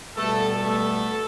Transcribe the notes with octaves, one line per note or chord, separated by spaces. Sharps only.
B2 G3 A3 B3 A4
A3 A4